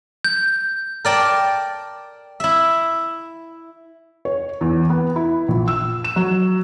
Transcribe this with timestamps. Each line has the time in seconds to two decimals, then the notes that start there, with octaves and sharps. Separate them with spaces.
0.25 G6
1.05 A#4 D5 G5 A5
2.40 E4 E5
4.25 C#5
4.61 E2
4.90 B3
5.16 E4
5.48 A#1
5.68 E6
6.04 E7
6.16 F#3